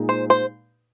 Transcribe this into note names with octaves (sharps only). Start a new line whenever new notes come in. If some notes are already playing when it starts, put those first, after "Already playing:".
Already playing: A#2 G#3 D#4
C5
C5